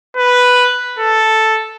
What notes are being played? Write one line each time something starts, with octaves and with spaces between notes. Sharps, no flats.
B4
A4